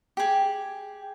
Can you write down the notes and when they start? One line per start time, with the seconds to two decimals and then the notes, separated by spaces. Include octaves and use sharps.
0.17 G4 G#4